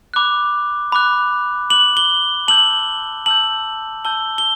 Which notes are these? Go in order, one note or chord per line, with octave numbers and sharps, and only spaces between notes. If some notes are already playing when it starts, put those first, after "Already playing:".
B5 D6 F#6
B5 D6 F#6
B5 D6 F#6 F#7
G7
A5 E6 G6 F#7
A5 E6 G6 F#7
A5 E6 G6 G7
G7